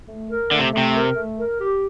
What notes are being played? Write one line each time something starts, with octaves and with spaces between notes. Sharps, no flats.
A3
A#4
D3 A3
C3
C3 A3
A#4
A3
A#4
G4